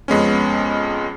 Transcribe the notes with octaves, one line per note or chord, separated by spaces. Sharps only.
F2 G#3 B3 C#4